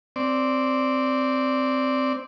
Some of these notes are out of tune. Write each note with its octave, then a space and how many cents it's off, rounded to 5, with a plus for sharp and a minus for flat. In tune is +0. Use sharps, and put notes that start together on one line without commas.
C4 +0 D5 -10